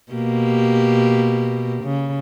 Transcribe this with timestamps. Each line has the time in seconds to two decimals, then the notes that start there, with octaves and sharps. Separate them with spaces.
0.12 B2 A#3 G4
1.83 C#3